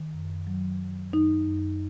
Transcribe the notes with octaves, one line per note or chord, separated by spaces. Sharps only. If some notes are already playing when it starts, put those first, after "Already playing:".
Already playing: D#3
F#2
F#3
F#3
F#2 D#4
F#2